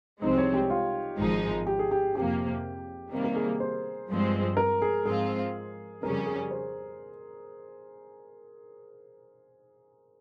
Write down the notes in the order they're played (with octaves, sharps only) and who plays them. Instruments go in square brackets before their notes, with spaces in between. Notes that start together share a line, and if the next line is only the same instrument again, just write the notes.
[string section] C2 C3 F3 G#3 C4 [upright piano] D#4
[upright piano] C#5
G4
F4
[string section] G#1 G#2 F3 G#3 D#4
[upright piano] G4
G#4
G4
[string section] F2 C3 F3 A#3 [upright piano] G4
[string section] C3 D#3 G3 A#3
[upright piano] A#4
G#4
C5
[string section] G2 F3 G#3 C4
[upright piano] A#4
G#4
[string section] G#2 F3 C4 F4 [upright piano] G#4
[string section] F2 C#3 G3 C#4 [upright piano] A#4
[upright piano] G#4
C5